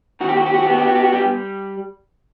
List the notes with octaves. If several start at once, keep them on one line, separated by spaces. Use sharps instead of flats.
D#3 F#4
G4
F#4
G4
F#4
G4
B3 F#4
G4
F#4
G4
F#4
G3 G4